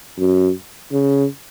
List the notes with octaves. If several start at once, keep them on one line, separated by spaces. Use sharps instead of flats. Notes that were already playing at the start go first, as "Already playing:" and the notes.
F#2
C#3